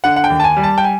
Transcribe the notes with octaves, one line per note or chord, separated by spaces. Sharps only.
D3 F#5
F#5
G5
D#2
A5
G#5
G3
A5
G5
G#5